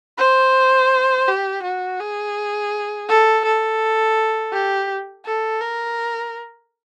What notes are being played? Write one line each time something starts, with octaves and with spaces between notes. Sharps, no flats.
C5
G4
F#4
G#4
A4
A4
G4
A4
A#4